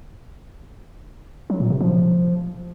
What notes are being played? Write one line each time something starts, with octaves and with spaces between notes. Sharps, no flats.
F#3
A#2
C3
F3